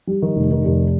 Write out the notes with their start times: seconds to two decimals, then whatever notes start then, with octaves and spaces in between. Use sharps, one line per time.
0.07 G3
0.22 D#3
0.36 F1
0.51 D#3
0.65 F1